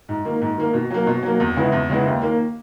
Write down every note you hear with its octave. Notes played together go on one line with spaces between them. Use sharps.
G#2
D#3 A#3
G#2
D#3 A#3
B2
F#3 A#3
B2
F#3 A#3
E2
C#3 G#3 B3 E4
E2
C#3 G#3 B3 E4
D#2
D#3 A#3